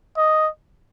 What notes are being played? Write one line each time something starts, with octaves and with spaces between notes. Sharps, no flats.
D#5